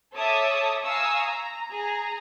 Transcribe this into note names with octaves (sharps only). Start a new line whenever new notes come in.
A4 C#5 E5 A5 D6 D#6
F5 G#5 A#5 C#6 D#6 E6
A#5
G#4 A#5